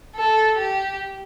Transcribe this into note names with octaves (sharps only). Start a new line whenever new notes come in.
A4
G4